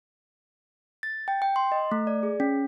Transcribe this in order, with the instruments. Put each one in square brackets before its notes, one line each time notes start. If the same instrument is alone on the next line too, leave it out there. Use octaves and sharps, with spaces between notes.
[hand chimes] A6
G5
G5
C6
D#5
A3
D5
G#4
C#4